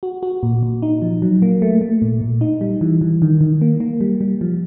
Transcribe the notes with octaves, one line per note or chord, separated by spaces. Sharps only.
F#4
F#4
A#2
A#2
D#4
F3
F#3
A#3
A3
A3
A#2
A#2
D#4
G3
E3
E3
D#3
D#3
A#3
A#3
G3
G3
F3